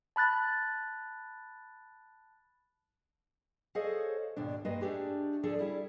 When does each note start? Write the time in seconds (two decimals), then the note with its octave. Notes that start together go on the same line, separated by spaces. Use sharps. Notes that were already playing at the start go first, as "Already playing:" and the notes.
0.16 A5 B5 F#6 A6
3.75 G#4 A4 C5 C#5 D#5 F5
4.36 D#2 G#2 B2 D4
4.65 G2 G#3 A#3 B4 D#5
4.81 A3 B3 D4 G4 G#4
5.43 D2 F3 D4 G#4 A4
5.59 G3 E4 G#4